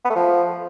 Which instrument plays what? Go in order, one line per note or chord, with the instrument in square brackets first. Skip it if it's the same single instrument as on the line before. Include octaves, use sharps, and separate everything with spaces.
[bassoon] B3
A3
F3